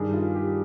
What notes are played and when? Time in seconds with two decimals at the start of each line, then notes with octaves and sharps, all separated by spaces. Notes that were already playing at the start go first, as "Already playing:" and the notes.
Already playing: G2 D#3 G#4
0.14 F4
0.35 G4